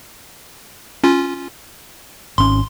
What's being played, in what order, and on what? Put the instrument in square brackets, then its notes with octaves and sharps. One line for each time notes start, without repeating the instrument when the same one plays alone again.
[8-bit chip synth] C#4 F4
[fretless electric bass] G#1 C#4 [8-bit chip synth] C6